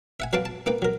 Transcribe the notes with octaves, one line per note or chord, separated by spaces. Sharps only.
E5 F#5 G#5
F#3 B4 F5 A5 C6 D6
A5
A#3 D#4 B4 G5
F#3 A#4